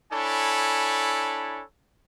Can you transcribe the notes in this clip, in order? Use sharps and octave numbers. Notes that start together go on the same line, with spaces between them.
D4 E4 A4 C#5 G#5 B5